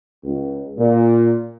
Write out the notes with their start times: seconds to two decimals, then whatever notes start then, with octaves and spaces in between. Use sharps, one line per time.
0.24 C#2
0.78 A#2